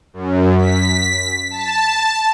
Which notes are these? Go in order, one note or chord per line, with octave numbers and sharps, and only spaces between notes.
F#2
B6
A5